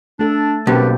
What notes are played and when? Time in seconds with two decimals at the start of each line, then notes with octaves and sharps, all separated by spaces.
0.19 A3 D4 A4
0.67 B1 A#3 C4 C#4 G4 B4